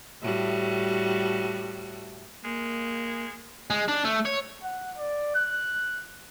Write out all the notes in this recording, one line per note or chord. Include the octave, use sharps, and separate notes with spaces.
A2 G3 F#4
G#3 A#3
G#3
D4
A3
C#5
F#5
D5
F#6